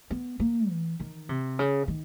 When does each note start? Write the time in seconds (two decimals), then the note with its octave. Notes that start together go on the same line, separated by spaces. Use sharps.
0.10 B3
0.40 A#3
0.69 E3
1.00 D#3
1.29 C3
1.59 C#3
1.88 D#3